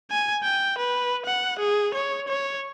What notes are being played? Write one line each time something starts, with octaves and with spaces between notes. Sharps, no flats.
G#5
G5
B4
F#5
G#4
C#5
C#5